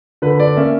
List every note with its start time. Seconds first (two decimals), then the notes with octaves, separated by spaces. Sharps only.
0.22 D3 B4
0.40 D5
0.56 A#3 C#4 E5